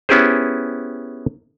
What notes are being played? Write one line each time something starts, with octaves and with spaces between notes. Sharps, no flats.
B3 C#4 E4 G4 G#4 C5